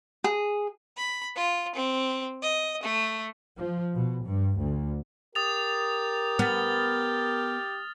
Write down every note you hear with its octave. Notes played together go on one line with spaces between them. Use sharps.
G#4
B5
F4
C4
D#5
A3
F3
B2
G2
D2
G4 A#4 D#6 A6 F7
B3 F6 A6